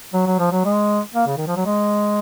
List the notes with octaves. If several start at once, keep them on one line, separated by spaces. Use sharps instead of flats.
F#3
F#3
F3
F#3
G#3
A#3
C#3
D#3
F3
F#3
G#3